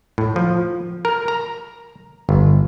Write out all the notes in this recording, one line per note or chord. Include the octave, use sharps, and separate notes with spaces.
A2
F3
A#4
A#5
G1